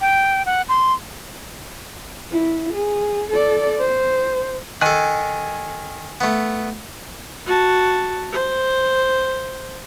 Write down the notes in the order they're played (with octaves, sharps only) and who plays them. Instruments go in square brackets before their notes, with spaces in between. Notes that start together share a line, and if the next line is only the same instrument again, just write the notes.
[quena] G5
F#5
C6
[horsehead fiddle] E4
G#4
A4 D5
C5
[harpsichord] D#3 A4 [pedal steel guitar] G#5 F#6
[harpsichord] A3 B3
[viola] F#4 A5
C5